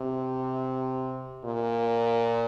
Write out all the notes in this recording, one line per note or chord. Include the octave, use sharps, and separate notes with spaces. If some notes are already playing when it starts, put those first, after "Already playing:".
Already playing: C3
A#2